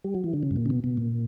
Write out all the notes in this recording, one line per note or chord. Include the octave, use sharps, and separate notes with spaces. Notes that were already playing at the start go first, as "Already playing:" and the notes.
G3
F#3
E3
D3
C#3
G2
A#2
C#3
B2
B2
A#2